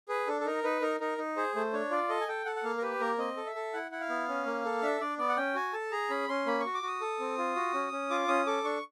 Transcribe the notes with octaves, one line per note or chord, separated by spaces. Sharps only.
G#4 B4
D4 A4
A4
D#4 A#4
D#4 B4
D#4 A#4
D#4 A#4
D#4
G#4 C5
A3 C5
D4 C#5
F4 D5
A4 D#5
G#5
A4 G5
A4 F#5
F#5
A#3 F5
A#4
G4 B4
A#3 A#4
C4 D#5
A4
E5
A4
E4 F#5
E4 F#5
F5
B3
C#4
A#3
A4
D4 E5
D4 D5
B3 D5
F#5
C#4 G5
F#4 G#5
A4 A5
G#4 A#5
C#4 B5
C#4 C6
A#3 B5
C#6
F#4
D6
F#4 D#6
A4
C4
F4
F#4
C#4
C#4
F4 D6
C#4 D#6
A4 D6
D4 C#6